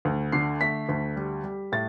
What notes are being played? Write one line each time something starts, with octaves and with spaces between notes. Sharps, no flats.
D2
D3 C7
A3 B6
D2
G3
G3
A2 A6